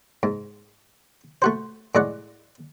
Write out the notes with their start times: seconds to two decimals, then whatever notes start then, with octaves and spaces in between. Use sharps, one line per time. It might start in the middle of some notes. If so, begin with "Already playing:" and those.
0.23 G#2
1.42 A3 F#4 C5
1.95 A2 G#3 D5 F#5